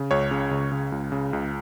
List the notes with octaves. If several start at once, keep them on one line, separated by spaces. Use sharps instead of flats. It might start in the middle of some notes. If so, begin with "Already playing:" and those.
Already playing: C#3
C#2 C#5
C#3
C#2
C#3
C#2
C#3
C#2